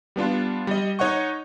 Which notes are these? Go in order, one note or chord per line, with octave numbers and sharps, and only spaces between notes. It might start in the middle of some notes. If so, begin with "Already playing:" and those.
G3 B3 D4 F4
G3 D#5
D#4 C#5 D#5 F#5 C#6